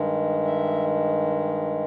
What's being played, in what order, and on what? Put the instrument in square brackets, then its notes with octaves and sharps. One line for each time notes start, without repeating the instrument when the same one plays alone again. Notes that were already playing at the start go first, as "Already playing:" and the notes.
Already playing: [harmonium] G2 D#3 G#3
E5